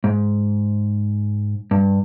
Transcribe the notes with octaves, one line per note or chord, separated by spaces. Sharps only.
G#2
G2